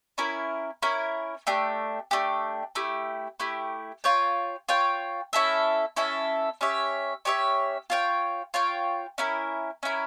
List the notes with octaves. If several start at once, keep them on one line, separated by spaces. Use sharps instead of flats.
C#4 E4 A#4
C#4 E4 A#4
A3 D4 G4
A3 D4 G4
A3 E4 G4
A3 E4 G4
F4 C#5 G5
F4 C#5 G5
C#4 E4 A4 E5
C#4 E4 A4 E5
C#4 G4 C#5 E5
C#4 G4 C#5 E5
F4 C#5 G5
F4 C#5 G5
C#4 E4 A#4
C#4 E4 A#4